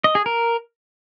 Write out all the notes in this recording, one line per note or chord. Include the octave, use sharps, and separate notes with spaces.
D#5
G#4
A#4